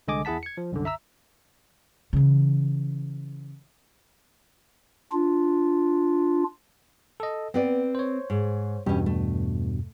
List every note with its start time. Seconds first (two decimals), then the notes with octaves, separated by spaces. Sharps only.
0.08 C2 D3 G#3 D#5 G#5 D6
0.25 E2 E4 G#4 F#5 A5 B6
0.43 G#6 C#7
0.57 F3
0.72 C2 F#2 D3
0.85 E5 A#5 E6
2.13 C#3 E3
5.12 D4 F4
7.20 A4 D#5
7.54 B3 C4 B4 D5
7.95 C5 C#5
8.30 G#2
8.86 E2 G2 B2 C#4 G4
9.06 A3